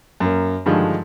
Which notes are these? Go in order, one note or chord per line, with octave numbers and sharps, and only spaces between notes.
F#2 A#3
G2 D3 D#3 F3 G#3 D4